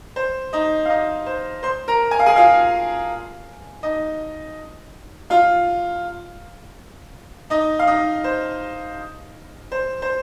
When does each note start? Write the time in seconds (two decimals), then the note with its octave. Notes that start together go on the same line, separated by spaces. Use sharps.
0.16 C5
0.53 D#4 D#5
0.85 F5
0.89 D#4 D#5
1.26 C5
1.63 C5 C6
1.88 A#4 A#5
2.11 G#5
2.19 F5
2.26 G#4 G#5
2.36 F4 F5
3.83 D#4 D#5
5.30 F4 F5
7.50 D#4 D#5
7.79 F5
7.87 D#4 D#5
8.24 C5
9.72 C5
10.02 C5